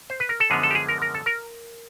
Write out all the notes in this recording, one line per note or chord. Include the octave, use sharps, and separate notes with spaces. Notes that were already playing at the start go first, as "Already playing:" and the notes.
C5
B4
A#4
A4
F#2 D3 F3 G#3 B3 G#4
A4
G4
G#4
A#4
A#4
A4
A#4